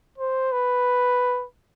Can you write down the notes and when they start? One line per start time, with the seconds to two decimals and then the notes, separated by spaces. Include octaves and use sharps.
0.18 C5
0.52 B4